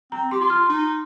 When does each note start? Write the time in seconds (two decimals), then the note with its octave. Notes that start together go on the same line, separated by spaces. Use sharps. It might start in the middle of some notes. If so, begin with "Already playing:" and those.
0.12 C4 A#5
0.31 G4 C6
0.41 F4
0.50 F6
0.69 D#4